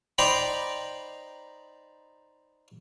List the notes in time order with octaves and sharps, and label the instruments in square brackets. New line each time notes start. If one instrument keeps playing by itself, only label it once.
[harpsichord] D#4 C5 D5 G5 A#5 B5